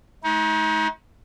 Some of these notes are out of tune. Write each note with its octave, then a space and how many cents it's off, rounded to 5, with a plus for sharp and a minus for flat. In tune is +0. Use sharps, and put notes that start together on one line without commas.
A3 -45 D#4 +35